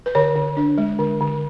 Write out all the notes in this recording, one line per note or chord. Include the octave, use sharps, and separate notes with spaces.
B4
D3 C#5
D3
D4
G#3
D3
D3